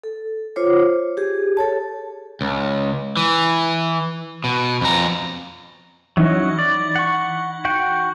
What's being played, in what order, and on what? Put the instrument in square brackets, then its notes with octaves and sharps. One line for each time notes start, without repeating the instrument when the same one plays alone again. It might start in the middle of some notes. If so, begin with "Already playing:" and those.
[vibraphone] A4
F4 C5 C#5 D6
G4 G#4
A4 C#5 A5
[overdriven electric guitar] C#2
E3
B2
F2 A#5
[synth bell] E3 D#4 [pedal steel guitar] F#3 C#4 F#4
[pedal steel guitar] D5
F#5 C#6
F#4 F#5 G5